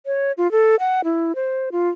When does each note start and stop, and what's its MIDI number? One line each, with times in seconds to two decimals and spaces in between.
0.06 0.32 73
0.38 0.50 65
0.51 0.76 69
0.80 1.01 78
1.04 1.35 64
1.35 1.69 72
1.72 1.89 65